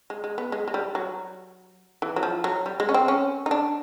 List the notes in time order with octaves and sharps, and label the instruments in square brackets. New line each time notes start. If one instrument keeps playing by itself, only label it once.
[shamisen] G#3
G#3
B3
G#3
G#3
G3
F#3
E3
F#3
F3
F#3
G3
G#3
C#4
C4
C#4
D#4
D4